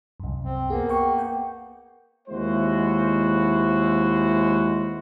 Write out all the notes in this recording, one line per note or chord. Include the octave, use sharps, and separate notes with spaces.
C2 F#2
C4
A#3 B3 G#4
G5 C#6
G5
D#2 G#3 E4 F#4 C5